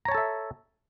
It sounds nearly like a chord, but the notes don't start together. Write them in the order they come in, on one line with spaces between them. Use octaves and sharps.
A#5 C#5 A5 A4 E5